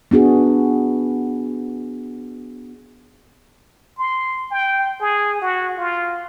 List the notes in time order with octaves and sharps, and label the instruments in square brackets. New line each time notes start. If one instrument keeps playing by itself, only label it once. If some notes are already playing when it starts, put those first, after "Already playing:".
[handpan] B3 D4 F#4 G#4
[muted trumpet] C6
G5
G#4
F#4
F4